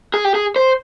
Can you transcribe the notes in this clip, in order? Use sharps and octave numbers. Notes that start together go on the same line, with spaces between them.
G#4
G4
G#4
C5